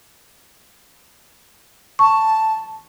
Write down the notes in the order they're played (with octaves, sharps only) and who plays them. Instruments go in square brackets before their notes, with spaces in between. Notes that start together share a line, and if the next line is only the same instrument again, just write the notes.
[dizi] A5 [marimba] C#6